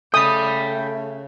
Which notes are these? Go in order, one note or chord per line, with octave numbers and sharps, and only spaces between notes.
C#3 A3 G5 B5 D#6